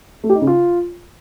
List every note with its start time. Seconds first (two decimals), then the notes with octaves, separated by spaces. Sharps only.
0.24 A3
0.30 G4
0.35 D#4
0.41 C#3
0.47 F4